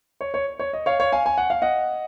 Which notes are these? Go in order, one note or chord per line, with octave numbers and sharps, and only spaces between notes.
C#5
C#5
C#5
D#5
C#5 F5
C#5 F5
F5 G#5
G#5
F#5
F5
D#5 F#5